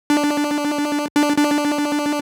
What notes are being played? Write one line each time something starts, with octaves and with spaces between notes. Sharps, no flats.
D4
D4
D4